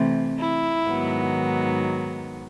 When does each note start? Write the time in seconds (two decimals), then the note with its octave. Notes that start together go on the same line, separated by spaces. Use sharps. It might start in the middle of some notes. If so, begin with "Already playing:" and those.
Already playing: C3 E3 A3 C4
0.40 E4
0.87 G#2 D#3 F#3 B3